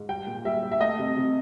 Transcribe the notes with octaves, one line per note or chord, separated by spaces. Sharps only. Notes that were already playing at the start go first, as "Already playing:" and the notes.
Already playing: G#2
G3 G5
A#2
G3 E5
G3
E5
A3 D#5
C3
C3